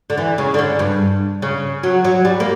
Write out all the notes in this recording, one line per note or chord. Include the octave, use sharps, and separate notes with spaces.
D3
E3
C#3
D3
C#3
G2
C#3
F#3
F#3
G3
A#3